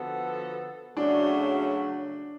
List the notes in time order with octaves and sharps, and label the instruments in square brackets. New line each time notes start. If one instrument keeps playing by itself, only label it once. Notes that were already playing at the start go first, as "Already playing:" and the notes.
Already playing: [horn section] D3 F3 B3 F#4 A4
[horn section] C#3 F#3 A3 [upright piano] D4